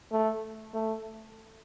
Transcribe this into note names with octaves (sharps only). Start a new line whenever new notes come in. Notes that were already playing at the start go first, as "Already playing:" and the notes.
A3
A3